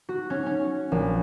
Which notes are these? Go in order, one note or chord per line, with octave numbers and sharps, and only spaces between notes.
F#4
C#4
C#4
A#1